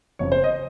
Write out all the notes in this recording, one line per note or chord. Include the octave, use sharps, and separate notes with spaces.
F#1 F2 C#3 C#5
C5
D#5